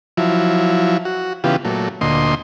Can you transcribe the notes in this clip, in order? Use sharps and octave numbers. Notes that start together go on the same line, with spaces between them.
F3 F#3 E4
F#4
C#3 E3 B3 F4 G4
A#2 F#3 A3
D2 A#2 D#5 C6